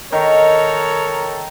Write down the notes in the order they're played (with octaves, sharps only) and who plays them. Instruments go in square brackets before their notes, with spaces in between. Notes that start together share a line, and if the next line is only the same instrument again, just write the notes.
[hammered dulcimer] D#3 [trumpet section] A4 A#4 C#5